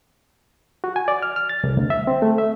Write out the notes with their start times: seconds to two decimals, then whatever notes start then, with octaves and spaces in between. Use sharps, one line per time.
0.84 F#4
0.96 G#5
1.08 D5
1.22 F6
1.36 F6
1.49 A6
1.64 C2
1.77 D2
1.90 E5
2.07 C4
2.22 A3
2.38 E5